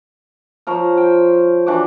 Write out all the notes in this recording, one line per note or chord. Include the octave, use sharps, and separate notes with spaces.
F3 A#4 C5 C#5
G5
E3 D4 F#4 D6